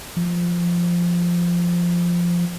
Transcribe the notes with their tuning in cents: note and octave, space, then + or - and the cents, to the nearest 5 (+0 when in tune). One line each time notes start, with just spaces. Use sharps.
F3 -5